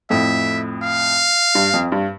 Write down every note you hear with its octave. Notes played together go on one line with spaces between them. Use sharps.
F2 A2 E5
F5
G2
F2
G2